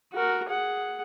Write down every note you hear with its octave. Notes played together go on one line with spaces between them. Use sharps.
F#4 A#4
G#4 F#5